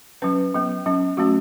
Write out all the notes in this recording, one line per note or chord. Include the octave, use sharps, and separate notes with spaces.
F#3 C#4 B4
F#3 B3
F#3 C#4
F#3 A3 C#4 F#4